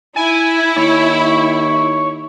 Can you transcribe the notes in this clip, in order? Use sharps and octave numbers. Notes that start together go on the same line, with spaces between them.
E4 G#5
D#2 C#5